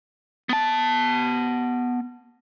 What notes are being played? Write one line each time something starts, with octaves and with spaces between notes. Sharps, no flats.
B3 A5